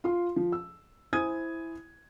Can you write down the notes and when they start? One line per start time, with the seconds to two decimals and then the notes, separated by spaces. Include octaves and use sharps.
0.04 F4 C6
0.36 F3
0.52 E6
1.13 E4 C5 G#5 D#6 G#6 D#7